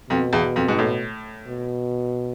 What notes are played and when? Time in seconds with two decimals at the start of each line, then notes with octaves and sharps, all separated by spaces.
0.10 F2 B2
0.33 E2
0.56 F2
0.68 G#2
0.78 A2
1.47 B2